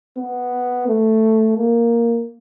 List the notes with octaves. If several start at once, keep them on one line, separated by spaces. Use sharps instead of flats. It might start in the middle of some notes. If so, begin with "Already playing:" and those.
B3
A3
A#3